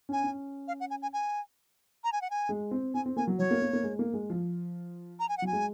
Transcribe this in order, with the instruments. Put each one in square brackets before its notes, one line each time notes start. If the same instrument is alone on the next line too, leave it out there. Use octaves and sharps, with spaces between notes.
[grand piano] C#4 [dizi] G#5
[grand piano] C#4
[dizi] F5
F#5
G#5
G#5
G#5
A#5
G#5
F#5
G#5
[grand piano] G#3
C4
[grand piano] C4 [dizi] G#5
[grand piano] C4
[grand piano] A#3 [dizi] G#5
[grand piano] F#3
[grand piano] F#3 [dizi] C#5
[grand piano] A#3
A#3
A#3
G#3
A#3
G#3
F3
[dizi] A#5
G#5
F#5
[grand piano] F#3 [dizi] G#5
[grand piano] G#3